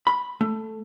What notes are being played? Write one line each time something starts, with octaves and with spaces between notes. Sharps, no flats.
B5
A3